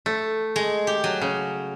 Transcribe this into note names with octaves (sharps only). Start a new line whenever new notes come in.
A3
G#3
G4
F#3
C#3